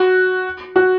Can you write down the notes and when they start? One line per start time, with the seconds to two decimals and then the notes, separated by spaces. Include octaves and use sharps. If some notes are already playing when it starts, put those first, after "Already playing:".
Already playing: F#4
0.76 F#4